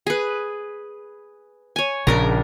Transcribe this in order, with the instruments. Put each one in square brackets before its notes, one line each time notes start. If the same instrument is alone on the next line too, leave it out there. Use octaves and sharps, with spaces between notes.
[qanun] G#4 B4
C#5 G#5
[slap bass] A#1 C#3 [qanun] D4 A#4 A#5